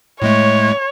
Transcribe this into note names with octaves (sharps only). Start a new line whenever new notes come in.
A2 G#3 A3 C#5